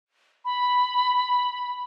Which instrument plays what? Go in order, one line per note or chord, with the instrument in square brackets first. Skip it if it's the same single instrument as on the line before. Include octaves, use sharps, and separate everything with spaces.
[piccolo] B5